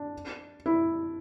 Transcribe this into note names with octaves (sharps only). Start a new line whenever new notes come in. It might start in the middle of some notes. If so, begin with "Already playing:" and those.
Already playing: D4
E4